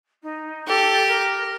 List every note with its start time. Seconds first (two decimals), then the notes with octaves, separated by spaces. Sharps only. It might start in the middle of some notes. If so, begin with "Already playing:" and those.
0.22 D#4
0.68 G4 A4
1.08 A#4